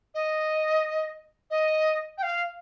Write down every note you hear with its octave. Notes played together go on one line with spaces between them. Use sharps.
D#5
D#5
G5
F5